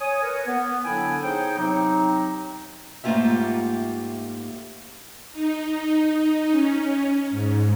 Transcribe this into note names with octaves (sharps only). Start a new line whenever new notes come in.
C#5 G#5 D#6
A#4 B4 C#5
B3
D3 F#3 D4 E4 G5 G#5
B3 D#4 G#4 C5 C#5 G5
C3 F#3 C4 D#4
G#2 A3 A#3 F4 G4 E5
D#4
C#4
G#2